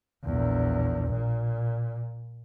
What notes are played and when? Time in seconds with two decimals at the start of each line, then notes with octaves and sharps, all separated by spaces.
0.24 A#1 E2
1.10 A#2